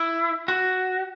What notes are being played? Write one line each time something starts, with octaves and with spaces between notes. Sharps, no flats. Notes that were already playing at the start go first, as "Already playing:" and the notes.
Already playing: E4
F#4